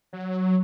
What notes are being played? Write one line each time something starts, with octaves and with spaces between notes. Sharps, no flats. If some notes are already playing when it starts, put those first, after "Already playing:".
F#3